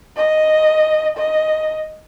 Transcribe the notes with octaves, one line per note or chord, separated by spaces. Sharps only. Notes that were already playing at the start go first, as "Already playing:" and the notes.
D#5
D#5